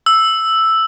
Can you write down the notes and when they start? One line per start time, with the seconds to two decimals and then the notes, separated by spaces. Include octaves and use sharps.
0.06 E6